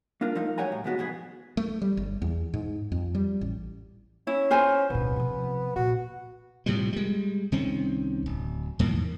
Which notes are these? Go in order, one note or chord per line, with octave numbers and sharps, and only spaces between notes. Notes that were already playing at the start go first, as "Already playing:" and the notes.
A#3 D4 F4 A#4
F3 A3 D#4 A#4 F5
F#2 G4 C#5 F#5 G#5 A#5
A2
D#2 A2 G#3 B3 F#4
F2 B2 B3 G#4
A3
G3
G1
E2
G#2
F2
G3
A1
C#4 E4
F4 C5 G#5
D1 B2 B3
C3 F3
A#2 F#4
A2 C3 F3 G3
G3 G#3
C2 D#3 C4 C#4
D1
E2 A2 D#3 A#3